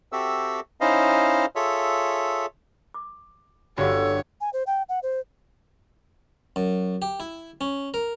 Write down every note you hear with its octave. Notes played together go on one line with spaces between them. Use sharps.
C4 F#4 G4 A4 E5 E6
C#4 D#4 E4 C5 D#5 F5
F4 G#4 A4 C#5 E5
D6
G1 F#4 G4 A4 C#5 F5
G#5
C5
G5
F#5
C5
F#2
G4
E4
C#4
A#4